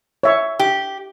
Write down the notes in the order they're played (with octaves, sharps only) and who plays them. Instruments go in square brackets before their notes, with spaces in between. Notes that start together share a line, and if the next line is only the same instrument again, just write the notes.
[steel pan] C#5 E5 C#6
[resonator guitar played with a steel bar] G4